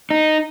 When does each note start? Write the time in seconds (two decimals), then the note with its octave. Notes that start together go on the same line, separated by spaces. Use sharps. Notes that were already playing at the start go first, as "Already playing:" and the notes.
0.11 D#4